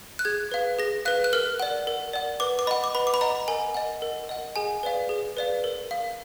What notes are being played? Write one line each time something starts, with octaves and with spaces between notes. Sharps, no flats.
F#6
G#4 G#6
B4 F5
G#4 A#6
B4 F5 F#6
F#6
A#4 F6
D5 F#5
A#4
D5 F#5
B4 D6
D6
D#5 F#5 B5
D6
B4 B5
D6
B5
D#5 F#5 A#5
A#4 G#5
D#5 F#5
A#4
D#5 F#5
G#4 G#5
B4 D5 F5
G#4
B4 D5 F5
A#4
F5